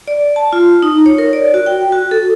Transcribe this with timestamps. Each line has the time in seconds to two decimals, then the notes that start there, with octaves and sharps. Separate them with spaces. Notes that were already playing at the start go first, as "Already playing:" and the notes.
0.08 D5
0.36 A5
0.53 F4
0.82 D#4
1.06 C#5
1.18 A#4
1.33 D5
1.54 F#4
1.66 G5
1.92 F#4
2.11 A4